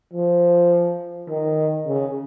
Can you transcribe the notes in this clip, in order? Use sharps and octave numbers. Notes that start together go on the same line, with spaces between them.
F3
D#3
C#3